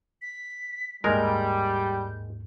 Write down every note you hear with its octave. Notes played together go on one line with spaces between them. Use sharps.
B6
D#2 G#2 G3 G#3 A#4 G6